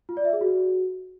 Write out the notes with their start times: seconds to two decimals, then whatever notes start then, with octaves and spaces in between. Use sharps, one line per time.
0.09 F4
0.17 D5
0.25 E5
0.33 G#4
0.41 F#4